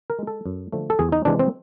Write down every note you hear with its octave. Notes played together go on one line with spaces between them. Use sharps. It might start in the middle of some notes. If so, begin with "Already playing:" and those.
A#4
G#3
A4
F#2
D3 F3 A3
A4
E2 G#4
D#4
C3 E3 G#3 D4
C4